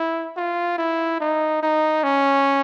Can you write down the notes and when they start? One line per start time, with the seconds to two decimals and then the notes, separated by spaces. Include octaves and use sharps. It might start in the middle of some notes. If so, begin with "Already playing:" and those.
Already playing: E4
0.37 F4
0.78 E4
1.20 D#4
1.63 D#4
2.04 C#4